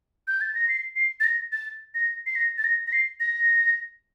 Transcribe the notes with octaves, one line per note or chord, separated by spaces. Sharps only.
G6
A6
A#6
C7
C7
A6
A#6
A6
A#6
C7
A#6
A6
A#6
A#6
C7
A#6